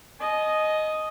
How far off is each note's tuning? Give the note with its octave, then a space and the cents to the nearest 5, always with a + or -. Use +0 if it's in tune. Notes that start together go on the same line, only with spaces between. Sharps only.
D#5 +0 G#5 +45